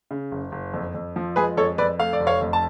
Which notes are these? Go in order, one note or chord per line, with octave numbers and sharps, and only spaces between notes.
C#3
F#1
F#1
F2
F2
F3
G#3 G#4 B4
F2 A4 C#5
F2 B4 D5
A3 F5
D5
F1
C#5 F5
F2
A5